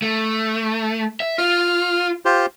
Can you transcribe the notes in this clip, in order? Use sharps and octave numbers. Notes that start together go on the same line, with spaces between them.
A3
E5
F4 F6
F4 G4 C5